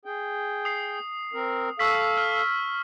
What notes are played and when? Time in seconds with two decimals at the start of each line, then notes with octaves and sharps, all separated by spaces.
0.05 G#4 G5
0.65 D#6 C7
1.33 C4 A#4
1.79 A4 F5 C#6 E6 B6
2.17 F6